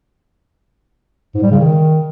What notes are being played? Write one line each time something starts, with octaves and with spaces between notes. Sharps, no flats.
G#2
G3
C#3
D#3